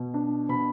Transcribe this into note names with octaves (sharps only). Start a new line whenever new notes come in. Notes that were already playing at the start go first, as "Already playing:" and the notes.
Already playing: B2
D4
B2 B5